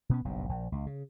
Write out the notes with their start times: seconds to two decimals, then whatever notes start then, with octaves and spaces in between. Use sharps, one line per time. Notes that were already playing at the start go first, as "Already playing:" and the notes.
0.09 B2 B3 C#4
0.25 F#1 B1 G2
0.49 A#1
0.72 C#2
0.86 C#3